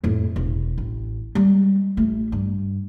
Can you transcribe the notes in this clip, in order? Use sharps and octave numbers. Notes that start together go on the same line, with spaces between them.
F2 A2
E1
A1
G3 G#3
A1 A3
G2